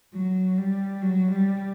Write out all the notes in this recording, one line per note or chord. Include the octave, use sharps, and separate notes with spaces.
F#3
G3
F#3
G3